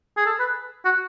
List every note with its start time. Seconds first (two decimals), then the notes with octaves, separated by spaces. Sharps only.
0.17 G#4
0.26 A4
0.40 B4
0.85 F#4